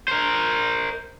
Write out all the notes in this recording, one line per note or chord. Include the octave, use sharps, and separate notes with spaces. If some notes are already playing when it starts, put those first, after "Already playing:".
A#4 C5